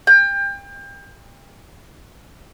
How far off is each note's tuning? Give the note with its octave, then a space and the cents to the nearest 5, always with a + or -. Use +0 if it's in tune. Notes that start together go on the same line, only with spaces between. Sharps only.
G5 +30